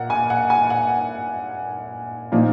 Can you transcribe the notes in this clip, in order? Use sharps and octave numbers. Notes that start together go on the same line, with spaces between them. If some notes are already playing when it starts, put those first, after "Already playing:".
Already playing: A#2 A#4 F#5
G#5
F#5
G#5
F#5
A#2 F3 A#3 D#4